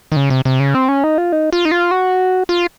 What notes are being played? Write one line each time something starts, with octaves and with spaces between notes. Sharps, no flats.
D#3
C#3
C3
C3
C#3
C4
C#4
D#4
F4
D#4
F4
D#4
F4
F#4
F4